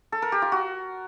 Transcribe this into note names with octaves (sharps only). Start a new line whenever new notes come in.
A4
A#4
G4
F4
F#4